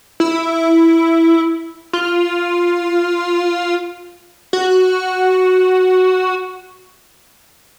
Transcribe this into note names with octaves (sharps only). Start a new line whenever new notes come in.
E4
F4
F#4